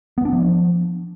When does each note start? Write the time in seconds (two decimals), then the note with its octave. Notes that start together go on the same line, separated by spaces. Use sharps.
0.18 B3
0.25 D4
0.33 F3